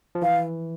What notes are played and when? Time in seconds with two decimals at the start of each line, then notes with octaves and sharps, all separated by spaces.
0.15 F3
0.22 E3 F5